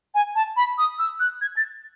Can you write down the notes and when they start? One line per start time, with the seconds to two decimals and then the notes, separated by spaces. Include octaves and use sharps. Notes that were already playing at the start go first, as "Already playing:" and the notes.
0.15 G#5
0.35 A5
0.57 B5
0.78 D#6
0.99 E6
1.20 F#6
1.41 G#6
1.57 A6